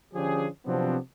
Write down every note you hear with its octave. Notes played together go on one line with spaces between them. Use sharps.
D3 F3 C#4 D4 G4 G#4
C3 F3 F#3 B3 C4 D4